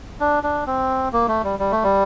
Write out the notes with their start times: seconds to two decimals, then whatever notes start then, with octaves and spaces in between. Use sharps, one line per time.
0.20 D4
0.43 D4
0.67 C4
1.13 A#3
1.28 A3
1.44 G3
1.59 G3
1.71 A3
1.84 G3